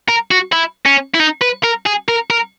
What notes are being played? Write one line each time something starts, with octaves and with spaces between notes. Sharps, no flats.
A#4
F#4
E4
C#4
E4
D#4
B4
A#4
G#4
A#4
A#4